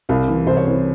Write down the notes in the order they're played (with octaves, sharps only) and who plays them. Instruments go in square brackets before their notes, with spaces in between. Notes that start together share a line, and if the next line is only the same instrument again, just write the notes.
[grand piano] C2 F5
C3 E3
C2 C5
C#5
C3 E3 C5